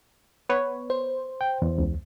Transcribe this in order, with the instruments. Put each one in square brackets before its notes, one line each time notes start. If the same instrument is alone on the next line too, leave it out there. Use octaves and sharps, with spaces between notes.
[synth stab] B3 B4 C#5
[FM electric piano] C5
[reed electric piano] G5
E2
[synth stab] C#2